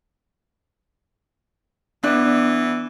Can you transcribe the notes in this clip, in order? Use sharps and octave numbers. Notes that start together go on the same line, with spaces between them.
E3 B3 D4